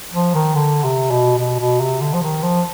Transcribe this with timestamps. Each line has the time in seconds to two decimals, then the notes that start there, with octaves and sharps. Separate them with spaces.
0.14 F3
0.34 D#3
0.55 D3
0.83 C3
1.10 B2
1.38 B2
1.59 B2
1.80 C3
2.01 D3
2.14 F3
2.22 D#3
2.43 F3